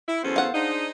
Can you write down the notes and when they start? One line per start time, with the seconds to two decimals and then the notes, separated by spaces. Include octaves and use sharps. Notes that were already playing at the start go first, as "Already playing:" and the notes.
0.08 E4
0.23 E2 F#3 B3 C#4 A4 C5
0.36 F5 F#5
0.54 D4 D#4 G#4 C5